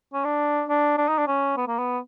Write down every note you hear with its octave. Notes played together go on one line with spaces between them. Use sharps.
C#4
D4
D4
D4
D#4
D4
C#4
B3
A#3
B3